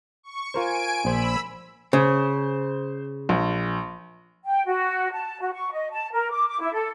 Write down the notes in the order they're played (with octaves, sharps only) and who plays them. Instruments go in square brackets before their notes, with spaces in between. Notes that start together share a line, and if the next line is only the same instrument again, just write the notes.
[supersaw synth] C#6
[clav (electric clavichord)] F4 A#4 C5 [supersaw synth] G#5 D7
[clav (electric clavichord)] A#1 C5 G#5 [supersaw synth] B5 E6
[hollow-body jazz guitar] C#3 [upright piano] C5
[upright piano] A#1
[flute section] G5
F#4
A5
F#4
C#6
D#5
A5
A#4
D6
D6
E4
A4